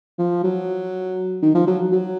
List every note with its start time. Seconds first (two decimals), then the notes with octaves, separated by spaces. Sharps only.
0.19 F3
0.44 F#3
1.42 D#3
1.55 F3
1.68 F#3
1.92 F#3